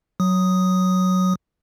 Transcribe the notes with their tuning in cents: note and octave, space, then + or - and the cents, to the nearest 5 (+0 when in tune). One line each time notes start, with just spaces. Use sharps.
F#3 +0 D#6 +0